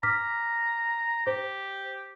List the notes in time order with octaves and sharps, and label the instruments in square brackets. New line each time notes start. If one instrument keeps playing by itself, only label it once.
[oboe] A#5 [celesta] D6 F6 B6
[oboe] G4 [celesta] C5